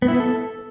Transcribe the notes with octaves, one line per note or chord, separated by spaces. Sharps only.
B3
E4
B3
A4